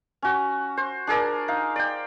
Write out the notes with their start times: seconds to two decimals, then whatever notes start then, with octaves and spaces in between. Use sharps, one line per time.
0.22 C#4 F#4
0.77 C5
1.07 D4 G#4 A#4 D5
1.48 D#4 F5
1.76 D5 G5